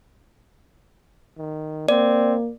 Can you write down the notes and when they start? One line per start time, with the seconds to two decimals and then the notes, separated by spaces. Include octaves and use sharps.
1.38 D#3
1.89 A#3 C4 D5